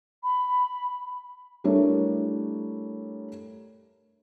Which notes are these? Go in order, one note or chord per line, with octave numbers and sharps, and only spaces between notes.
B5
G3 A3 D4 E4 A#4 C#5